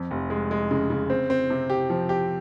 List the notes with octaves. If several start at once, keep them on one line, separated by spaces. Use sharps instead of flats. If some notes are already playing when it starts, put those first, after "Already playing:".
Already playing: F2
F1
G#3
G#3
C#3
C#3
C4
C4
C3
G4
F3
G4